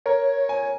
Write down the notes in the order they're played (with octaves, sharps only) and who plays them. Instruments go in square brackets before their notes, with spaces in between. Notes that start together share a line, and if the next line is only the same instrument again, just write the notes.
[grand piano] A#4 [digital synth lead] C#5
[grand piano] G#5